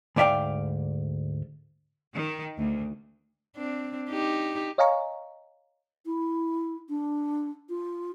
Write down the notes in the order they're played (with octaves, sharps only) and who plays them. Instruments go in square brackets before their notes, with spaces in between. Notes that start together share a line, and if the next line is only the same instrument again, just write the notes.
[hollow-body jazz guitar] D2 G#2 D5 E5 F5 G5
[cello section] D#3
D2
[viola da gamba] C4 D4
D#4 G4
[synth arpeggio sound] C#5 D#5 F5 G#5 A#5 C#6
[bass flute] E4
D4
F4